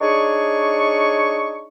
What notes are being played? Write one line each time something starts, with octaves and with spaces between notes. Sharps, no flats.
D4 D#4 G#4 C#5 C#6